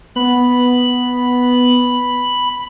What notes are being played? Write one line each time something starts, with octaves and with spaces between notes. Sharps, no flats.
B3 B5